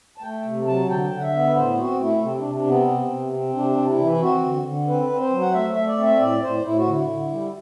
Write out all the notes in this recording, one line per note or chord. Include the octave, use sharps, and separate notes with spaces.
A5
A3 G5
C3
F#3 A5
D3 G5
D3
F#5
E5
B3
B4
A2 C5
C4 F#4
A3 E4
C3 C4
C3 D4
D4
B3
C4
C3
C3
C4
C3 D4
C3
E4
E3
E4
C4 F#4
D3
D3
C4 B4
C4
C5
F#3
F#5
A3 E5
E5
A3
D5
C4
E5
A2 D5
A2 C5
A2 E4
F#4
D3 E4
D3
G3